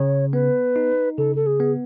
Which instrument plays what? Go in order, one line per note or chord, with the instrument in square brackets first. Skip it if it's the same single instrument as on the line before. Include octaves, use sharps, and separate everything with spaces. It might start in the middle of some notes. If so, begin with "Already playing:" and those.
Already playing: [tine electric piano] C#3 [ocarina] C#5
[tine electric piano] B3 [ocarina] B4
[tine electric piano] D#4
[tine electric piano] C#3 [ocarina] A4
[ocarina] A4
G#4
[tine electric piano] B3